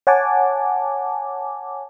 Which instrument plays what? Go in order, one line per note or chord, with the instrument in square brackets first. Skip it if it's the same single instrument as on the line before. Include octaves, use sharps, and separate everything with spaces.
[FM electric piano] C#5 F#5 G#5 A5 D6